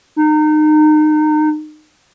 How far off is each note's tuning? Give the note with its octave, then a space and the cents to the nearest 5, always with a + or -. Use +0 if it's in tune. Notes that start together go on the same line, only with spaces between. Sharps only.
D#4 -25